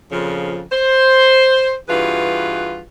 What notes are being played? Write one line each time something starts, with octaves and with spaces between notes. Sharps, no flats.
F2 A#2 C#3 F3
C5
G2 E3 F4 F#4 G#4 B4